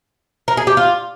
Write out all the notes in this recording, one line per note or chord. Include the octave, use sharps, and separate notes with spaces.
A#4
G#4
G4
F4